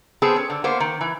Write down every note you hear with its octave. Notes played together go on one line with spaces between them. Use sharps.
B3 C4 G#4 A4 C5
C#4
D3
A#3 B3 C5
D#3
E3